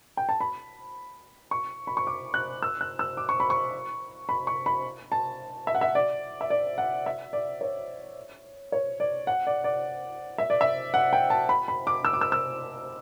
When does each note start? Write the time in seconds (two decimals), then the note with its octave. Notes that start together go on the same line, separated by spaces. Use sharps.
0.17 G5
0.29 A5
0.40 B5
1.51 C#6
1.87 B5
1.97 C#6
2.07 D6
2.34 F#6
2.62 E6
2.81 F#6
2.99 E6
3.17 D6
3.29 C#6
3.40 B5
3.50 C#6
4.29 B5
4.47 C#6
4.66 B5
5.12 A5
5.67 E5
5.75 F#5
5.81 E5
5.95 D5
6.41 E5
6.50 D5
6.78 F#5
7.06 E5
7.33 D5
7.61 C#5
8.72 C#5
9.00 D5
9.27 F#5
9.47 D5
9.64 D5
10.38 E5
10.50 D5
10.61 E5
10.94 F#5
11.13 G5
11.30 A5
11.49 B5
11.68 B5
11.87 D6
12.05 E6
12.13 D6
12.21 E6
12.32 E6